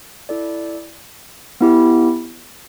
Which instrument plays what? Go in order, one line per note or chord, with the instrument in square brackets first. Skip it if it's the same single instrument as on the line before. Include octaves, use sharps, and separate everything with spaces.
[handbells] E4 A4 D5
B3 E4 G4